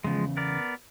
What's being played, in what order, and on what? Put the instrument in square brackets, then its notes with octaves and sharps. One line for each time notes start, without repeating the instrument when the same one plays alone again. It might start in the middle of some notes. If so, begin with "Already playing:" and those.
[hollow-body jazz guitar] E2 C#3 [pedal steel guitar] F3 G#3
[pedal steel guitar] B3 A#4 D5